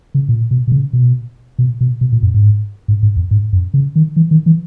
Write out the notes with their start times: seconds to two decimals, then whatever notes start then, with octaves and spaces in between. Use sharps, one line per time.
0.15 C#3
0.29 A#2
0.51 B2
0.67 B2
0.72 C#3
0.93 B2
1.59 B2
1.81 B2
2.01 B2
2.12 A#2
2.23 F#2
2.34 G#2
2.88 G#2
3.03 G#2
3.16 E2
3.31 G#2
3.53 F#2
3.74 C#3
3.96 D#3
4.16 E3
4.31 D#3
4.46 E3